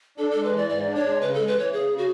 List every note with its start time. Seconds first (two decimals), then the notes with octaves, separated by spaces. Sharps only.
0.18 D4 A4
0.31 G#3 A4
0.44 B4
0.52 E3 D5
0.69 G#2 D5
0.87 D4
0.95 C#5
1.04 G#3
1.21 C#3 B4
1.34 G#3 A4
1.47 B4
1.55 E3 C#5
1.73 C#3 G#4
1.90 C#3
1.98 F#4